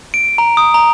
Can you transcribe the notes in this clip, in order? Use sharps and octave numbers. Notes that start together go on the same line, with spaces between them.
D7
A#5
D#6
A#5